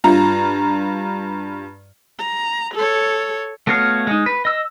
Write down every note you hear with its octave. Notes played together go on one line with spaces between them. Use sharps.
G2 F4 A#5
A#5
A4 C#5
A3 B3 F#4 C#5 F5
G#3 D#4
B4
D#5 E6